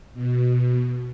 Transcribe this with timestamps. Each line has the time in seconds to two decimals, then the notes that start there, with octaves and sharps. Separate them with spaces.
0.14 B2